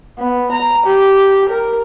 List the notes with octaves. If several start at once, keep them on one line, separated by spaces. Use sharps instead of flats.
B3
A#5
G4
A#4